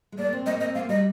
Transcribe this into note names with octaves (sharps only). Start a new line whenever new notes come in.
G#3
A#3 D5
C4
A#3 D#5
C4 D#5
A#3 F5
G3 D#5